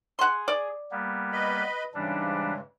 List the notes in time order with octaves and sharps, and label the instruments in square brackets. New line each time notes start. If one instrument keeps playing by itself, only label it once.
[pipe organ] G#4 [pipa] F#5 C6
[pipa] D5
[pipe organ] G3 A#3 B3
[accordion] B4 D#5 B5
[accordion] G#2 C#3 [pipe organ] E3 G3 D4